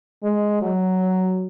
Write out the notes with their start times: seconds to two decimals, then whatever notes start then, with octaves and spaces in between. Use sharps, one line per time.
0.23 G#3
0.62 F#3